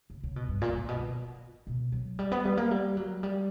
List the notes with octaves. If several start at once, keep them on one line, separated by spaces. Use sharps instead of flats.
C#3
C#3
B2
G2
A#2
A#2
B2
B2
B2
F#3
G3
B3
G3
A#3
G3
F#3
G3